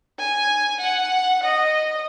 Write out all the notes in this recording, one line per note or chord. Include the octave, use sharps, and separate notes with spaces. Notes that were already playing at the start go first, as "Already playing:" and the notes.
G#5
F#5
D#5